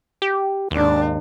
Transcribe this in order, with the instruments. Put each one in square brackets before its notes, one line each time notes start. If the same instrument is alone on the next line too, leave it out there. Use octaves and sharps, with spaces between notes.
[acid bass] G4
[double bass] G#1 D4 [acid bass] D#2